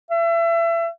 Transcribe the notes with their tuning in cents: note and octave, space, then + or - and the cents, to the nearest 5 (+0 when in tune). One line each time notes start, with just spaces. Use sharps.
E5 +30